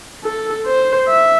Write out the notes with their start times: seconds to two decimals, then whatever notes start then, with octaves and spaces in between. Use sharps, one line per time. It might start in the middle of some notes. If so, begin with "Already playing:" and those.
0.24 A4
0.67 C5
1.08 E5